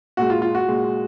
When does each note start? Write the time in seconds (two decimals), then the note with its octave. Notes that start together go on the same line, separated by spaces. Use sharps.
0.17 A#2 G#3 F#4
0.30 F4
0.42 F4
0.55 F#4
0.68 A#2 G#3